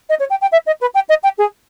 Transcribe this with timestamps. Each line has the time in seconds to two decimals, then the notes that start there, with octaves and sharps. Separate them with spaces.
0.09 D#5
0.19 C#5
0.30 G5
0.41 G5
0.52 E5
0.66 D#5
0.81 B4
0.94 G5
1.09 D#5
1.23 G5
1.38 G#4